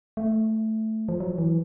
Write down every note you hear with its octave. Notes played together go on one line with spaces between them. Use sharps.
A3
F3
F#3
E3